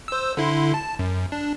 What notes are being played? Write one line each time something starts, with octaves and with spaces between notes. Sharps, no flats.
C5 E6
D3 E4 C6
A5
F#2
D4